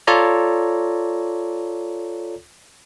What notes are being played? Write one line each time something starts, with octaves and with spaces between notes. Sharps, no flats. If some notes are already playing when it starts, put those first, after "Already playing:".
F4 A4 C#5 D5 A#5